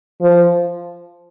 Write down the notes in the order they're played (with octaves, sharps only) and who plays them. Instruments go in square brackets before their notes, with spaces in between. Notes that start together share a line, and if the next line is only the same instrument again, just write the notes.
[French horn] F3